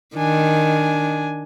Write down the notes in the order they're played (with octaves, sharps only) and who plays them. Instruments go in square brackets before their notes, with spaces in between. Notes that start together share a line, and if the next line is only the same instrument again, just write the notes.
[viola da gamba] D#3 [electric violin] D4 G#5